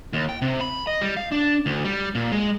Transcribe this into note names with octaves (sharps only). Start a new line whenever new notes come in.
D#2
G5
C3
B5
D#5
G3
F5
D4
D2
G3
A#2
G#3